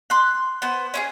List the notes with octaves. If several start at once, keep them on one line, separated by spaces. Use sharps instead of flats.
C6 F#6
B3 C5
C#4 E4 G#4